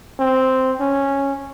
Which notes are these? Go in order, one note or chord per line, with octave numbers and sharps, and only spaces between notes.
C4
C#4